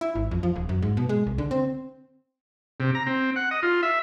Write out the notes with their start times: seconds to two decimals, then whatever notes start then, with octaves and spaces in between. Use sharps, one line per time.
0.01 E4
0.15 G#1
0.31 F2
0.43 F3
0.56 D#1
0.69 F#2
0.82 G#2
0.97 B2
1.09 G#3
1.27 C2
1.38 D3
1.51 C4
2.80 C3
2.95 A#5
3.07 C4
3.36 F#5
3.51 D#5
3.63 F4
3.83 E5